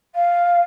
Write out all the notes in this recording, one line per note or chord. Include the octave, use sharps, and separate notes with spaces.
F5